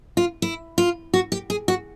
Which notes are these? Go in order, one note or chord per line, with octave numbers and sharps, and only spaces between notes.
F4
E4
F4
F#4
G4
G#4
F#4